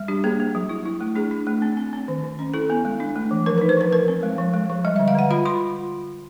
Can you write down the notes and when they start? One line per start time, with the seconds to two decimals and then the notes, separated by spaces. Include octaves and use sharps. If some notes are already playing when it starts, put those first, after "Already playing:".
Already playing: G3
0.08 D4 G4
0.24 A#3 G#4
0.40 A#3
0.55 F#3
0.69 E4
0.86 E4
1.01 A3
1.16 D4 G#4
1.31 D4
1.47 A3
1.62 C4
1.77 C4
1.93 C4
2.08 D#3
2.24 D#3
2.39 C#4
2.54 E4 A4
2.70 B3
2.85 G#3
3.00 D4
3.16 A3
3.31 E3
3.46 F3 A#4
3.58 D#4 B4
3.69 C5
3.77 F3 B4
3.93 F3 A#4
4.08 C4
4.23 G#3
4.38 F3
4.54 G#3
4.70 F3
4.85 G3 D#5
4.96 D3 E5
5.08 F5
5.15 D3 F#5
5.31 F4 B5
5.45 F4 C6